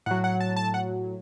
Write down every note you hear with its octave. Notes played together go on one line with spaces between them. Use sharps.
A2 F#3 F#5
F#5
A5
A5
F#5